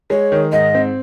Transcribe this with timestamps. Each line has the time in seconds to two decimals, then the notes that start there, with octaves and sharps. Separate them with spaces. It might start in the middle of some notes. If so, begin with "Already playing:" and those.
0.10 G#3 C#5
0.32 D#3
0.52 G#2 D#5
0.75 C4